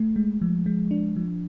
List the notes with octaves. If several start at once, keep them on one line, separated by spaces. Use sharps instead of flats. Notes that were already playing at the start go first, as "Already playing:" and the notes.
Already playing: A3
G#3
F3
G#3
D4
F3